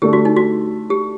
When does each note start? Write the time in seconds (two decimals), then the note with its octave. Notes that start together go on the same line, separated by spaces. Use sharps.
0.02 D3 A3 D4 G4
0.13 F#4
0.25 D#4
0.36 F#4
0.90 G4